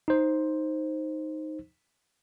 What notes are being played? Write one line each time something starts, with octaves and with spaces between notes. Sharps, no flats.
D#4 C5